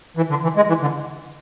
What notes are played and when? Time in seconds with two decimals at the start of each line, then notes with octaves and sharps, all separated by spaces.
0.17 E3
0.30 D3
0.43 E3
0.56 G#3
0.68 E3
0.81 D3